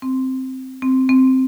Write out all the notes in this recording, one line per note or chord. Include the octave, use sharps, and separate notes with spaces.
C4
C4
C4